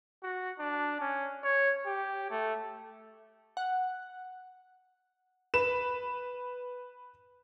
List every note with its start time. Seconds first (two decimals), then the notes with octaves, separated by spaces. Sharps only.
0.23 F#4
0.59 D4
1.00 C#4
1.44 C#5
1.86 G4
2.31 A3
3.57 F#5
5.54 B4 E7